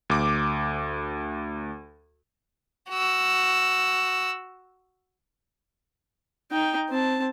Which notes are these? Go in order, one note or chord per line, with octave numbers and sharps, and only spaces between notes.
D2 D6
F#4 E6
D#4 G5
C4 A5